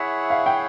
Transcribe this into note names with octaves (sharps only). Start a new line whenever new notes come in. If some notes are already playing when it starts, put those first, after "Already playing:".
Already playing: E4 G#4 C#5 E5 F#5
F5
G5